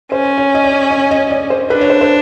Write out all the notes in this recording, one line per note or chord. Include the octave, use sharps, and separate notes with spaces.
C#4 C5
C#5
D#5
D5
D#5
D#5
D5
C5
D4 B4
C#5
C5
C5